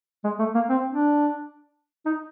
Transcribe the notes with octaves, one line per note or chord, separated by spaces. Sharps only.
G#3
A3
A#3
C4
D4
D#4